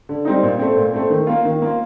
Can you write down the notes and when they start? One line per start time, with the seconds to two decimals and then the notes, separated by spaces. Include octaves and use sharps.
0.09 D3
0.25 G3 C4 D#4
0.43 A#2
0.59 A3 C4
0.77 A#2
0.94 A3 C4
1.10 D#3
1.27 A#3 F4
1.45 D#3
1.62 A#3 F4